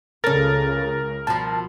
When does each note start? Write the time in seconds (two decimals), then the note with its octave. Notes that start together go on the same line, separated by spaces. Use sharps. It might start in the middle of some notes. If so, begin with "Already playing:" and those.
0.24 C#2 C#3 C#4 A4 A#4 A6
1.27 B2 F3 A5